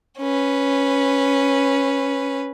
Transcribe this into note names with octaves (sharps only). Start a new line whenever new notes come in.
C#4 B4